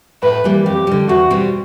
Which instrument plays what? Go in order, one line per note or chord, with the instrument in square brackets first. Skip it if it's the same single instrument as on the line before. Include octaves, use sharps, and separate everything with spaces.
[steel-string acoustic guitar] A2 [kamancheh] B4
[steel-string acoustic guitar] E3 G3 A#3
[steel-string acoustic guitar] F2 [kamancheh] G4
[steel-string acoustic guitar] D3 G3
[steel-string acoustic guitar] E2 [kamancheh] F#4
[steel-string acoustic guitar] B2 G3 C4